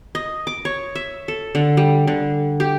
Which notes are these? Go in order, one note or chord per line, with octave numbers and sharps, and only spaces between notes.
D#5
D6
C#5
E5
A4
D3
G3
D3
G4